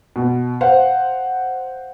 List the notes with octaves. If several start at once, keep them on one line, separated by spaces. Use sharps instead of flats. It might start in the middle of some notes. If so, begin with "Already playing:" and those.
B2
C5 F5 F#5